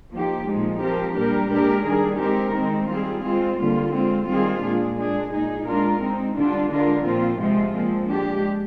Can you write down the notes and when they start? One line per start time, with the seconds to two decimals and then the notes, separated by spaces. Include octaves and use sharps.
0.14 F3 A#3 D#4 G4
0.48 A#2 F3 G#3 D#4
0.83 F3 C4 G4 A#4
1.18 A#2 G3 D4 G4 A#4
1.52 A#2 G#3 D4 G4 A#4
1.87 D#3 G3 D4 G#4
2.21 G#3 C4 D#4 G4 A#4
2.56 D#3 G#3 C4 D#4
2.90 G3 C4 F4 G#4
3.25 G#3 C4 F4
3.59 D3 G3 A#3 F4
3.94 G#3 C4 F4
4.29 D#3 G3 C4 F4 G#4
4.63 A#2 G#3 D4 G#4
4.98 G#3 D4 G#4
5.32 A#2 G#3 D#4 G#4
5.67 G#3 D4 F4 A#4
6.02 G#3 C4 D#4
6.36 D3 G3 D4 F4
6.70 D3 G#3 D4 F4 A#4
7.05 A#2 F3 C4 F4
7.39 C3 F3 G#3 C4 F4
7.74 A#2 F3 G#3 C4
8.09 G#3 D4 G4